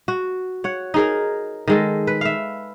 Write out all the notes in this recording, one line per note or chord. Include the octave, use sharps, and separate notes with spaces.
F#4
C#5 F#5
D#4 G#4 A#4
D#3 G#3 A4
B4
E5 F5